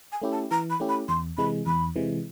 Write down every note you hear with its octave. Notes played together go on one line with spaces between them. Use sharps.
G#5
A3 C#4 E4 G4
A5
E3 A#5
B5
A3 C#4 E4 G4
B5
E2 C6
C3 E3 G#3 B5
E2 B5
C3 E3 G#3